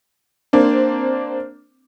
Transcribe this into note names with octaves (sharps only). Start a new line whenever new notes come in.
A#3 C4 D4